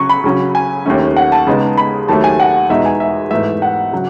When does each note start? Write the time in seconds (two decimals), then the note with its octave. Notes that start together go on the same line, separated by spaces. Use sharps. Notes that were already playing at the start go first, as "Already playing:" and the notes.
Already playing: C#3 F#3 C#4 C#6
0.09 B5
0.24 C#3 F#3 C#4
0.55 G#5
0.86 D#2 D#3 A3 C#4
1.16 F#5
1.32 A5
1.47 C#3 G#3 B3 D#4
1.78 B5
2.08 D#2 D#3 F#3 A3 A5
2.24 G#5
2.40 F#5
2.69 E2 B2 G#3 D#4 E5
2.86 G#5
3.00 E5
3.31 G#2 E3 A3 E5
3.62 F#5
3.92 C#3 F#3